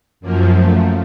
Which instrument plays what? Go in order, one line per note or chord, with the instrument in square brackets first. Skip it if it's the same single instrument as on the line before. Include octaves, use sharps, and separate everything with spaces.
[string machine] F#2 F3 A#3
A3